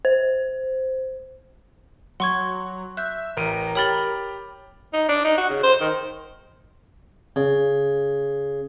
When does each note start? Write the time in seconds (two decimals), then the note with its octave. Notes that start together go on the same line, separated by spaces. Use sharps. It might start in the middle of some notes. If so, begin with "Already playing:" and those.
0.05 C5
2.20 F#3 F#5 C6 C#6 G#6
2.97 E5 F#6 G6
3.37 A1 A#4 D7 D#7
3.75 G4 C#5 B5 F6 A6 G7
4.93 D#4
5.09 D4
5.25 D#4
5.37 F#4
5.50 C#3
5.64 C5
5.81 D#3
7.36 C#3